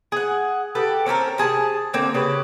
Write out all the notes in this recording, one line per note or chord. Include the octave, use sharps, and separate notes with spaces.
G#4 F#5
G4 A4 B4
C4 C#4 A4 A#4
C3 G#4 A5
D3 A#3 C4
C#3 G4 B4